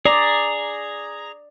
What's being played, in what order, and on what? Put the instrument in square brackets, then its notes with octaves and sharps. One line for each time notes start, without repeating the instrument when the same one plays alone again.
[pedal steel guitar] G#4 A#5 [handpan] D5